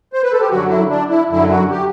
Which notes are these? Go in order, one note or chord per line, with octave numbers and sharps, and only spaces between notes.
C5
B4
A4
G4
F#2 D3 F#3 F#4
E4
D4
E4
F#2 D3 F#3 E4
F#4
G4